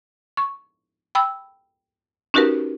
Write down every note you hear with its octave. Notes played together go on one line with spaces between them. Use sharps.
C#6
G5 B5 E6
C#4 D#4 F#4 G4 A#4 B4